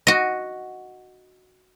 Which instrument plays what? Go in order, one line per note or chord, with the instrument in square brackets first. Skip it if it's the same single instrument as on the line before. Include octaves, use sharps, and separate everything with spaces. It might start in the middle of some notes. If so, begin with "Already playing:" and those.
[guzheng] F#4 D#5